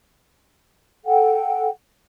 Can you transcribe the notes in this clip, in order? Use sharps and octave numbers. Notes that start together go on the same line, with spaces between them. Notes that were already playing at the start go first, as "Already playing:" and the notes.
A4 F#5 G5